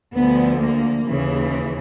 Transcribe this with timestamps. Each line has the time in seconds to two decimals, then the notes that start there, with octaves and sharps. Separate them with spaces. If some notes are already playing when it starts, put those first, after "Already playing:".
0.14 D2 D3 F3 B3
0.60 A#3
1.06 D#2 C#3 E3